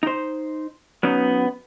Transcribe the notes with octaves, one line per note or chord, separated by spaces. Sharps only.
D#4 C5
F#3 B3 C#4 D#4